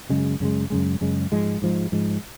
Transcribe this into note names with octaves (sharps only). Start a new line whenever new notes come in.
F#2 C#3 G#3
F#2 C#3 G#3
F#2 C#3 G#3
F#2 C#3 G#3
G#2 F3 G#3
G#2 F3 G#3
G#2 F3 G#3